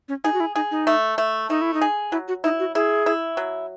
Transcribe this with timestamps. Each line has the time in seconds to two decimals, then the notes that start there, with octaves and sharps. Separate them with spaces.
0.09 C#4
0.24 D#4 G#4
0.34 F#4
0.40 E4
0.55 D#4 G#4
0.71 D#4
0.87 A3
1.18 A3
1.49 A3 D#4
1.61 E4
1.74 D#4
1.81 G#4
2.12 F#3 E4
2.28 F#4
2.44 D#4 E4
2.60 F#4
2.75 E4 G#4
3.06 E4
3.37 F#3